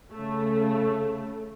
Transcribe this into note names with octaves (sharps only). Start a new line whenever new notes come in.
C#3 A3